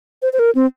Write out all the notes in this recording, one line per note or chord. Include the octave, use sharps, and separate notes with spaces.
C5
C5
A#4
C4